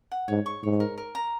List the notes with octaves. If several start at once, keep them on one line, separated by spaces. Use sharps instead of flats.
F#5
G#2 C#5
C#6
G#2 C#5
A#4
A#4
A#5